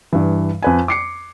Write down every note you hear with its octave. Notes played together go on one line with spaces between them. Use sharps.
G2 E3
F2 B4 G#5
D6 C7 C#7